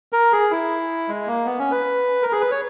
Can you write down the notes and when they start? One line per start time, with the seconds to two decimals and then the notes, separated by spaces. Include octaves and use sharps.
0.13 A#4
0.32 G#4
0.51 E4
1.08 G#3
1.27 A#3
1.46 B3
1.59 C#4
1.72 B4
2.23 A#4
2.32 G#4
2.41 B4
2.51 C#5